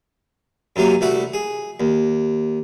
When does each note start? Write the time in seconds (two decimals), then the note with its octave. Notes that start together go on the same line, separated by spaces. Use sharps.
0.76 F#2 C3 F#3 A#3 G#5
1.01 C2 A3 F#4 A4 B5
1.33 G#4
1.80 D#2